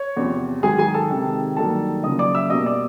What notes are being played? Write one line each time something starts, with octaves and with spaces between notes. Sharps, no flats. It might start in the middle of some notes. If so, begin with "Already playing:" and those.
Already playing: C#5 C#6
E2 C3 F3
G#2 D#3 F#3 G#4 G#5
G#4 G#5
A4 A5
C3 D#3 G#3
G2 D#3 F#3 A#3 A4 A5
F#2 C#3 F3 A#3 D#5 D#6
D5 D6
E5 E6
B2 G3 A#3 D#5 D#6
D5 D6